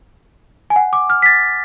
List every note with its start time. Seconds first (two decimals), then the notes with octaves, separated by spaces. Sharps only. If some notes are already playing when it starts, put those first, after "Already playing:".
0.70 G#5
0.76 F#5
0.93 D6
1.10 F6
1.22 B6
1.26 A6